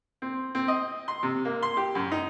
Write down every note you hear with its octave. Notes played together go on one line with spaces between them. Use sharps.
C4
C4
D#5
C6
C3
A#3
C6
G4
F#2
D#4